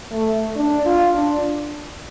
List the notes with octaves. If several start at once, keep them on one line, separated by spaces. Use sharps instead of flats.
A3
D4
F4
D4